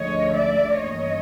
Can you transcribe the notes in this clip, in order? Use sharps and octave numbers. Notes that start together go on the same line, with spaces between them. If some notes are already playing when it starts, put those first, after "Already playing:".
Already playing: D2 D3 F3 G#3 C#4 C#5 D#5
D5 E5
G2 E3 G3 A#3 C#4 C#5 D#5